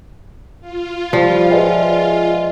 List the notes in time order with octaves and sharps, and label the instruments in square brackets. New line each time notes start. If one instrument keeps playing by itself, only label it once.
[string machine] F4
[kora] F3 [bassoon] G3
[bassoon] G#3 [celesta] B4 D5 E5